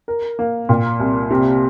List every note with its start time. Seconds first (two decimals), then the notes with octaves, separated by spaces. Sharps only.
0.08 A#4
0.39 A#3
0.69 A#2
1.00 C2
1.31 C3